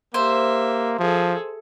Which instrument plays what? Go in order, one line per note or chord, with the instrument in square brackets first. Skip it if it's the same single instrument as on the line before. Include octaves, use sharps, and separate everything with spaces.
[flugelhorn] A#3 [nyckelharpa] G4 E5 [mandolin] C5
[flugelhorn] F3 [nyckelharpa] G#4 A4